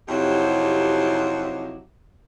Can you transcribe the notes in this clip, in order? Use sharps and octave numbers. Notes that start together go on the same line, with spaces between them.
F2 C3 F#3 D#4 E4 G4